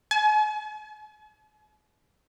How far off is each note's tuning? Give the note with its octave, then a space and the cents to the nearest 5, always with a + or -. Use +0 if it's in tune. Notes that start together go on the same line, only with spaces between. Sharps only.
G#5 +45